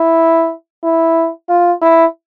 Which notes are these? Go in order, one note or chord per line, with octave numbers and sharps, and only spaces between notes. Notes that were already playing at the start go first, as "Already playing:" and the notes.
Already playing: E4
E4
F4
E4